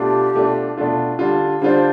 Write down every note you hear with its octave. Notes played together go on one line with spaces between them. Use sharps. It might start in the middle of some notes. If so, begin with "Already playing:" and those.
Already playing: B2 A3 D4 F4 G4
B2 A3 D4 F4
B2 A3 D4 F4
D3 G3 D4 F4
D3 G3 D4 F4 C5